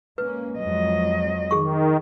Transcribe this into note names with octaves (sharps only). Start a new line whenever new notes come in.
G#3 A#3 C#4 B4
F2 F3 F#3 G#3 D#5
D#3 G#4 C#6